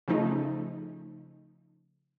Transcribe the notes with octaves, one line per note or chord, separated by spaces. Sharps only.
C#3 F3 A3 D#4